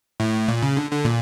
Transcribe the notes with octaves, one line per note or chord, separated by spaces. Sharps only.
A2
A#2
C#3
D3
D3
A#2